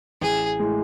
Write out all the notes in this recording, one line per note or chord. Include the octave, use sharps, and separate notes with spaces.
A1 G#4
A2 G#3